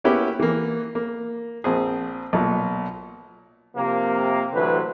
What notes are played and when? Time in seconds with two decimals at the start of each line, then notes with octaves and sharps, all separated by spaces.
0.04 A#3 B3 C#4 E4 G4
0.40 E3 A#3
0.95 A#3
1.64 A#1 C4 G#4
2.33 B1 A#2
3.76 C3 F3 A#3
4.53 A1 D3 E3 F#3 B4 C5